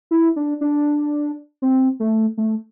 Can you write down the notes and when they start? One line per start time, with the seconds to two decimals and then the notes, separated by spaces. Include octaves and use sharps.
0.11 E4
0.36 D4
0.61 D4
1.62 C4
2.00 A3
2.38 A3